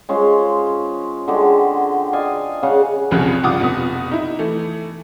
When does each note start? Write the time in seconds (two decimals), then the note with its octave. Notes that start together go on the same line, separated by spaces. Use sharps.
0.09 G#3 C#4 F4 C5
1.28 D3 G#3 F#4 G4
2.13 D5 D#5 F5 G#5
2.63 C#3 F5 F#5
3.11 F1 C2 C#3 F3 C#4 F#6
3.43 G2 F4 F#5 D6 D#6
3.60 F1 B2 B3 D#6
4.11 D#4 E4
4.39 E3 A3